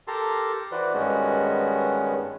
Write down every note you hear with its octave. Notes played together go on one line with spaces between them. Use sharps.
G4 A4 A#4 A5 A#5 C6
E3 F#4 B4 C5 D5
G2 D#3 G#3 B3 C#4 F#4